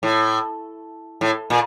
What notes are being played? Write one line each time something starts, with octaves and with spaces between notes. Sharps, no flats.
A2
A2
A#2